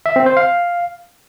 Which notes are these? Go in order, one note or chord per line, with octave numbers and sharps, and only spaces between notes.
E5
C4
C5
F5